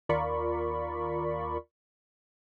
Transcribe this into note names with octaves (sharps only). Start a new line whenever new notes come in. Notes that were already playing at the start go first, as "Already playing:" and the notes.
D#2 F4 A#4 D5 B5 C#6